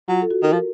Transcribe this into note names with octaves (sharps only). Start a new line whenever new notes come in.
F#3 F4
A4
F#4
D#3
F3 A#4